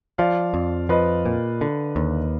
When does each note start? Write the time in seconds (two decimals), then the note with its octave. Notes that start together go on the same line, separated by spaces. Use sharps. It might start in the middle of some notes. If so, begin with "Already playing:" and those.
0.18 F3 D5 F5
0.54 F2
0.89 F3 B4 D#5
1.26 A#2
1.61 D3
1.96 D#2